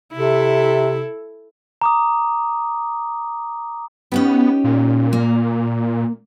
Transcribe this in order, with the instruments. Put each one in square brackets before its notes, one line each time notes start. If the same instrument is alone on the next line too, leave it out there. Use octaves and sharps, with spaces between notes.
[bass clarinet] C3 [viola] E4 A4
[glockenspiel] A#5 D6 D#6
[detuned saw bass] B3 [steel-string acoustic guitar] C#4 D#4 G4
[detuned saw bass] A#2
[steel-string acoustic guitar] A#3